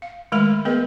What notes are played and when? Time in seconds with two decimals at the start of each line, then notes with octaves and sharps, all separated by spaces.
0.02 F5
0.32 D#3 G#3 A3 A#4 B5
0.65 B3 G#4 A#4 B4 D#5